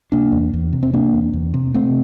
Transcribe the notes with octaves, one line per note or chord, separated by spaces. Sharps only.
C3 A#3 D4
E2
E2
C3
C4
C3 A#3 D4
E2
E2
C3
C3 A3 C4